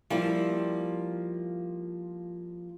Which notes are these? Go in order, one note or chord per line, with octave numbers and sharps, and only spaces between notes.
F3 G3 A#3 E4